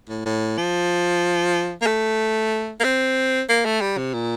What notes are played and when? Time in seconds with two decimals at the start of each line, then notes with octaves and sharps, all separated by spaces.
0.09 A2
0.25 A2
0.58 F3
1.82 A#3
1.87 A3
2.80 A#3
2.84 C4
3.49 A#3
3.65 A3
3.81 G3
3.97 C3
4.14 A#2